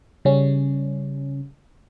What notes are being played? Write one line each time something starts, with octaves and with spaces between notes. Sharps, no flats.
C#3 G3 C#4